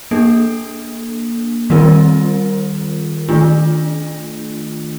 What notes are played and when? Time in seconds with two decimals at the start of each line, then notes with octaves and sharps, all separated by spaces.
0.11 A#3 D4 A4
1.70 D#3 G3 C4 F4 A#4
3.29 D#3 A3 D4 F4